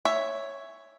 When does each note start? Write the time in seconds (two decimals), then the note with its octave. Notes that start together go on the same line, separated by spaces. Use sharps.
0.05 C#5 E5